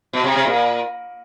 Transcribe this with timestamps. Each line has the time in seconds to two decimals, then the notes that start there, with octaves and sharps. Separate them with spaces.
0.13 B2
0.24 C3
0.35 C3
0.46 A#2